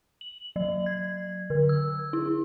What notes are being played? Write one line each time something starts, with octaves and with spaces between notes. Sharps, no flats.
F#7
F#3
G#6
D3
E6
E4